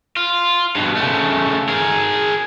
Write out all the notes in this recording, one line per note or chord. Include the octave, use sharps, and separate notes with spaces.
F4
G2 B2
C#3 A3
G#4 A#4